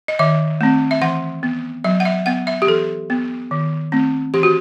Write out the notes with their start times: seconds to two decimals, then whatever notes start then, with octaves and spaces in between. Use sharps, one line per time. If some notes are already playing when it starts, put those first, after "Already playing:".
0.08 D#5
0.19 D#3 E5
0.61 A3 C4
0.91 E5
1.02 E3 F#5
1.43 B3
1.84 F#3 E5
2.00 F#5
2.05 E5
2.26 B3 F#5
2.47 E5
2.62 G4
2.67 E3 A4
3.10 B3
3.51 D#3
3.92 A3 C4
4.34 E3 G4
4.43 F#4